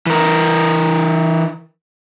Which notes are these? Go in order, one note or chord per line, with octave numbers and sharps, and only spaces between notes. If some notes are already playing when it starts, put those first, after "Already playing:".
E3 A#4